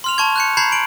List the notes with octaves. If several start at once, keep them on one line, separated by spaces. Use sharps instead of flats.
C6 F6 F7
A5 C#6 G#6
F#6 G6 C#7
A#5 B5 G6 G#6 C7
D7 F#7